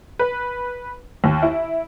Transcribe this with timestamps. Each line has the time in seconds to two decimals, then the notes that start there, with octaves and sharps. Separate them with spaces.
0.19 B4
1.24 D#2
1.43 E4